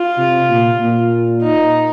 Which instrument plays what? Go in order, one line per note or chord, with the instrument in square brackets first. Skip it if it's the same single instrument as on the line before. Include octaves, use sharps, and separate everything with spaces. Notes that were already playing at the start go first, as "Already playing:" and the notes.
Already playing: [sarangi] F4
[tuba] C3
A#2
A#2
[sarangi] D#4